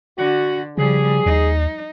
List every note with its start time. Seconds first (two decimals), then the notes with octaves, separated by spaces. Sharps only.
0.18 D3 F#4
0.78 C#3 F3 G3 G#4
1.26 D#2 D#4